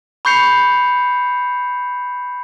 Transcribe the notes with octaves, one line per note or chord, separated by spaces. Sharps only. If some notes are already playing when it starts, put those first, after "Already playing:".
B5 C#6 G6 C7 C#7 F7